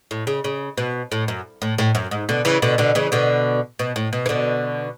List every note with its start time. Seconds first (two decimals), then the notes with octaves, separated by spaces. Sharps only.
0.11 A2
0.27 C#3
0.44 C#3
0.77 B2
1.12 A2
1.28 F#2
1.62 A2
1.78 A2
1.95 F#2
2.11 G#2
2.29 B2 D3
2.45 C#3 E3
2.62 B2 D3
2.78 B2 D3
2.95 C#3 E3
3.12 B2 D3
3.79 B2
3.96 A2
4.13 B2
4.26 E3
4.29 B2 D3